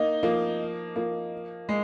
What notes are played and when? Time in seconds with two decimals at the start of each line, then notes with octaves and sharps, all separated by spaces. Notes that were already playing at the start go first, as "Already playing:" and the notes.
Already playing: A#3 D#4
0.23 F3 A#3
0.96 F3 A#3
1.69 G#3